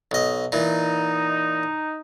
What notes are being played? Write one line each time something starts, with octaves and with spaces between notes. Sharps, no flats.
B1 D#5
A#2 E3 D#4